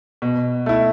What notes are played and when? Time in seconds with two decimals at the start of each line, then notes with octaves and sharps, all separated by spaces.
0.22 B2
0.66 A3 E4